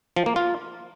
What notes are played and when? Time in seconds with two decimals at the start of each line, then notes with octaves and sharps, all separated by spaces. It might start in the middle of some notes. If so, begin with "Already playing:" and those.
0.16 F3
0.26 A#3
0.36 F4